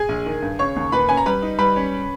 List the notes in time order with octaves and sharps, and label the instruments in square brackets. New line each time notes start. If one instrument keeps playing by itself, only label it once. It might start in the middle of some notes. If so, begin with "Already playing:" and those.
Already playing: [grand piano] G#4 G#5
A#1
D#3
G2
C#3 C#5 C#6
D#2
A#2 B4 B5
C#4 G#5
A#5
G3 B4 B5
D#4
G3 B4 B5
C#4